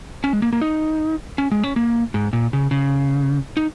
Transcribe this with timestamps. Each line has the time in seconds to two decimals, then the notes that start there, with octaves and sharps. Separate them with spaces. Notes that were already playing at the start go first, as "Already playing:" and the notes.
0.24 C#4
0.33 G#3
0.42 A#3
0.53 A#3
0.61 D#4
1.38 C#4
1.52 G#3
1.64 C#4
1.76 A#3
2.14 G#2
2.33 A#2
2.53 C#3
2.71 C#3
3.57 D#4